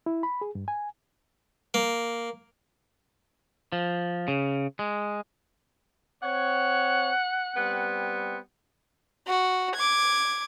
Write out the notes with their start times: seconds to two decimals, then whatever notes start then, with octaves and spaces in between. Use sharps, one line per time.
0.06 E4
0.23 B5
0.41 G#4
0.55 G2
0.68 G#5
1.74 A#3
3.72 F3
4.28 C#3
4.79 G#3
6.23 C4 C#5 F#5
7.55 G3 B3 C4
9.27 F#4
9.75 D6 G#6